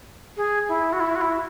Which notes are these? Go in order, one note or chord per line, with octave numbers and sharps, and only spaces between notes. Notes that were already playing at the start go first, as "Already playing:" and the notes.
G#4
E4
F#4
E4
F#4
E4